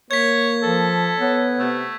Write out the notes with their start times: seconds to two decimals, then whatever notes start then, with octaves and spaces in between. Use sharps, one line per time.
0.11 A#3 C#5 G#6 B6
0.63 F3 A4
1.19 B3 C#5
1.59 C3 A3